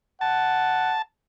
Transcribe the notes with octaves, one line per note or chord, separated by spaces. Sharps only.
F#5 A5